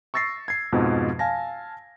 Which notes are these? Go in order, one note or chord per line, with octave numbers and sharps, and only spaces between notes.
C#6 E6 A6 A#6 C7
G#6 C7
F2 G#2 B2 F3
F5 G#5 A5 A#6